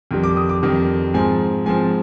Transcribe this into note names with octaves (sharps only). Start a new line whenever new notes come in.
F2 D#3 G3
D6
D#6
D6
F2 D#3 G3
G#2 F3 C4 G#5
G#2 F3 C4 G#5